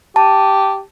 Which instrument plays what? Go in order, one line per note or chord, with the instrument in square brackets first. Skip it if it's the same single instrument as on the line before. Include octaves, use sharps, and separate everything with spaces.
[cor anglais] G4 [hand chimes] A5